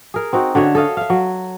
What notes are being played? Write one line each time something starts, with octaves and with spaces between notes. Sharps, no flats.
G#4 A#4
C4 D#4 F#4
D3 F#4 C#5 E5
A4 D#5 F5
E5 F5
F#3